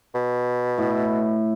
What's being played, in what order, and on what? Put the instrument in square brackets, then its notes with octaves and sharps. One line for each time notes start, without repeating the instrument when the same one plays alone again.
[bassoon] B2
[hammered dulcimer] A2